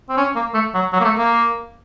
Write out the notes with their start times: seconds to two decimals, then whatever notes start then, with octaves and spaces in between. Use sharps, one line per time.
0.09 C4
0.17 C#4
0.35 A#3
0.54 A3
0.74 F#3
0.93 F#3
1.00 A#3
1.05 A3
1.18 A#3